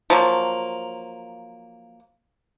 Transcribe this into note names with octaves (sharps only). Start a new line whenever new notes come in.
F3 F#3 A#3